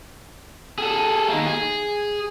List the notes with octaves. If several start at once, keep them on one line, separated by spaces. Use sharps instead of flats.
G#4 A4
D#3 A#3
G#4